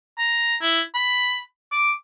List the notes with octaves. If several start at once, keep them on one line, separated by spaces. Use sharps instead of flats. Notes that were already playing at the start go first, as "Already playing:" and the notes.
A#5
E4
B5
D6